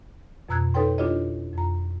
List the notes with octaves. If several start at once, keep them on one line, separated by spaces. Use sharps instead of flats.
F2 B2 A#5 E6 F#6 G#6
D#4 A4 B4 C#5 G5 C6
D4 E4 F4 G4 C#5 D#5
F2 A#5